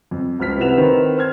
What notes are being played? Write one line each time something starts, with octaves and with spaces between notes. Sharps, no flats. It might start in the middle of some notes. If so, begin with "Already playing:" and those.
F2
C#2 F3 F6 B6
C3 E4 B4 F#5 E7 F7
D#3 C4 B4
C5 F6 G#6